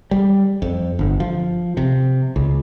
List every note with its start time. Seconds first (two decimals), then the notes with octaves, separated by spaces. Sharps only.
0.11 G3
0.62 F2
0.99 G1
1.20 F3
1.77 C3
2.36 C#2